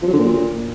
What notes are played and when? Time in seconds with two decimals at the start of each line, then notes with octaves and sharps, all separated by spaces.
0.02 F3
0.08 F#3
0.13 D3
0.19 A#2